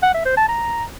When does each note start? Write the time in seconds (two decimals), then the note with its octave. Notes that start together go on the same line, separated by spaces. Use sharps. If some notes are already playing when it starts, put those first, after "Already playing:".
0.03 F#5
0.14 E5
0.26 C5
0.37 A5
0.48 A#5